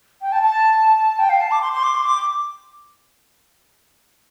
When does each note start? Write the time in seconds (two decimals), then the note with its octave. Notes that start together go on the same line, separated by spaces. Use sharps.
0.21 G5
0.32 A5
0.43 A5
1.19 G5
1.29 F5
1.40 A5
1.51 D6
1.61 C6
1.72 C6
1.83 D6
1.94 C6
2.05 D6